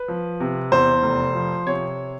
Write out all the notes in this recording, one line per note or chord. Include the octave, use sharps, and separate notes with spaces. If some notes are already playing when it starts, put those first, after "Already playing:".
Already playing: B4
F3
C3
E2 C5
F1
F3
C3 C#5